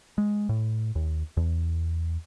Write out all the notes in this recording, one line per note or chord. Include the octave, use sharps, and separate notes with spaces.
G#3
A2
D#2
E2